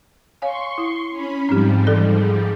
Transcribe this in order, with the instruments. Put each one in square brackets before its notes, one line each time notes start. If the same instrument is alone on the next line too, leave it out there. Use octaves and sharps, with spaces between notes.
[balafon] C#5 F5 G#5 [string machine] C6 C#6
[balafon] E4
[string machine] C#4 B5
[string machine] G#2 F3 G3 [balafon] C4 D#4 G4
[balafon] E3 A4 C5
G#4